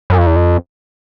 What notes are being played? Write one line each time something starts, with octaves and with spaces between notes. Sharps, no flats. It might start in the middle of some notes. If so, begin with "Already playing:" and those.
F#2
F2
E2
F2